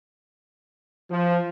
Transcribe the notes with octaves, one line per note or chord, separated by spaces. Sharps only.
F3